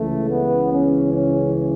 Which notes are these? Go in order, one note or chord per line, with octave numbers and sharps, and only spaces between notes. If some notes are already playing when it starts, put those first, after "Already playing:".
Already playing: C#2 C#3 E3 A3
B3
C#4
C#4